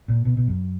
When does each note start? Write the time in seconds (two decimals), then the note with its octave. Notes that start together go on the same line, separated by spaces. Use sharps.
0.08 A#2
0.25 B2
0.37 B2
0.48 F#2